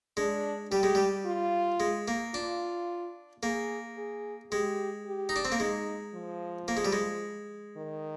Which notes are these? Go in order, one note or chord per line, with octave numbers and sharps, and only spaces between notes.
G#3 D4
G3 G4
G#3
G3
F4
G#3
A#3
D4 F4
A#3 G#4
G#4
G#3 G4
G4
D#4
D4
C4
A#3
G#3 D#4
F3
A#3
G#3
G3
G#3
D#3